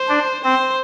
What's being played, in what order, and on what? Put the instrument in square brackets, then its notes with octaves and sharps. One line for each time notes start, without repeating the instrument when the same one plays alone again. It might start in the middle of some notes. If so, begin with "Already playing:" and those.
Already playing: [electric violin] C5
[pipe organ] D4
[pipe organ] C4 [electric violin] C5